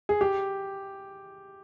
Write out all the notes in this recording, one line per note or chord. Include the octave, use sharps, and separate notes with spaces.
G#4
G4